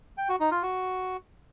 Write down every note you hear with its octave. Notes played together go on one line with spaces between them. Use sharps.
G5
F#4
D#4
F4
F#4